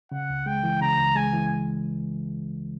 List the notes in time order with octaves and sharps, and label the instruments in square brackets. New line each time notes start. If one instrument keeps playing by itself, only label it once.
[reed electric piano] C#3 [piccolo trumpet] F#5
[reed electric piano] C#2
[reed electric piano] G#3 [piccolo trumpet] G5
[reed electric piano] E3
[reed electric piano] C#3 [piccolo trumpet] A#5
[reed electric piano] C#2
[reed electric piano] G#3 [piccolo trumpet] G#5
[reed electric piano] E3